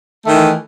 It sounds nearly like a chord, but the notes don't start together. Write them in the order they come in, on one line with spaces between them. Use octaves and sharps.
A3 D#3 E3